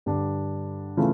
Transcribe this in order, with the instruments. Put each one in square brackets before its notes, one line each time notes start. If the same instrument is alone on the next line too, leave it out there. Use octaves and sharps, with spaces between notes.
[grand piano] G2 D3 G3 D4
C#3 E3 A3 F4